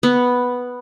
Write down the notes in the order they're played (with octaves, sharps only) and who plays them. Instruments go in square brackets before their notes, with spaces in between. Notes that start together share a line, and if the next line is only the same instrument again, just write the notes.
[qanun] B3